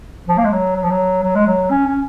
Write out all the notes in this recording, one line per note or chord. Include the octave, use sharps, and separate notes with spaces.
F3
A#3
G#3
F#3
F#3
F3
F#3
F#3
G#3
F#3
C#4
C#4